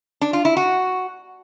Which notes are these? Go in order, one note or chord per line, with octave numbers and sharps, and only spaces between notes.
D4
F4
E4
F#4